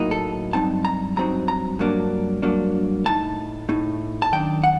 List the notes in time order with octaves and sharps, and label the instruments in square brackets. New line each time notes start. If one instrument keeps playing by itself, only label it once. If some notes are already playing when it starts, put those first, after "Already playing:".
Already playing: [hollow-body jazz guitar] A2 F#3 A#3 D#4
A4
G2 F#3 C4 D#4 A5
A#5
G2 F#3 C4 D#4 A#5
A#5
G2 F#3 A#3 D4
G2 F#3 A#3 D4
A2 A3 D#4 A5
A2 A3 D#4
A5
F#2 D#3 D4 G5
F#5